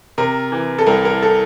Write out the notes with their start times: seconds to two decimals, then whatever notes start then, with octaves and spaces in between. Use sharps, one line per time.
0.18 C3 A#4
0.52 E3
0.78 A4
0.86 C2 A#4
1.05 A#4
1.23 A4